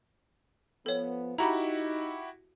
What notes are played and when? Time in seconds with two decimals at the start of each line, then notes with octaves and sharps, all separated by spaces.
0.86 F3 B3 A4 C#5
1.38 D#4 E4 F#4 G4 A#5 B5